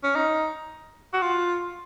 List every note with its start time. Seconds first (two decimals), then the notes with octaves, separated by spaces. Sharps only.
0.03 C#4
0.15 D#4
1.13 F#4
1.22 F4